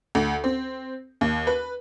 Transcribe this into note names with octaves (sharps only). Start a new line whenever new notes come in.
D2
C4
D#2
B4